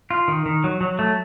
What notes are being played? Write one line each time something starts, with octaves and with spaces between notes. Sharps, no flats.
F4
D#3
D#3
F#3
F#3
A3